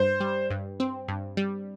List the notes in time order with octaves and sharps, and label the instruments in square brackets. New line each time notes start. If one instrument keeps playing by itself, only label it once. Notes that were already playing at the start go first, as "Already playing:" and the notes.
Already playing: [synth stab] G2 [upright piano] C5
[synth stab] G3
G2
C4
G2
G3